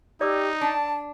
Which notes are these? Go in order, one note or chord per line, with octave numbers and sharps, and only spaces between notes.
D#4 G4 D5 D6 E6
D4 A5